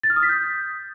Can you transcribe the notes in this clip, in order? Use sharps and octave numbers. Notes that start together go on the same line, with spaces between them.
A6
F6
D#6
B6
G6